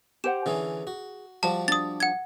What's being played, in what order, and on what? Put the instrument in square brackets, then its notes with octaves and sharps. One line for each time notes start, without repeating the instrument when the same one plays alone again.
[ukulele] G4 C5 F#5 [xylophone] E7
[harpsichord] D3 E3 C#4 [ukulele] G#4
[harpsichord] F#4
[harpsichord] F3 G3 F#4 [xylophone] A5
[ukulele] D4 [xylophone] D#6 A6
[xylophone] F#5 G#6